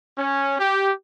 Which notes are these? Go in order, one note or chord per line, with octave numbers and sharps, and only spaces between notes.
C#4
G4